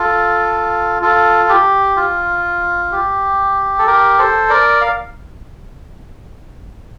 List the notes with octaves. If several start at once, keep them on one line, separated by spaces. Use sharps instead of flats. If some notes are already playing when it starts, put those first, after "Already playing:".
Already playing: F4 A4
F4 A4
G4
F4
G4
A4
G4 A#4
A4 C5
A#4 D5
F5